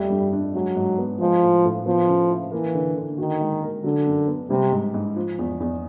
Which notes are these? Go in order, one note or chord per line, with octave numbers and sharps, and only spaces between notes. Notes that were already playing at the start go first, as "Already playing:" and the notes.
Already playing: F2 G3 A3
G2
D4
F#3 G#3
G#2
B3
F3 G#3
A2
A2
F3 B3
C#3
E4
E3 A#3
D3
D3
D#3 F#4
G#3
A#4
D3 F#3
F#2
B3
C3 G3
G#2
G#2
F3
E2
E2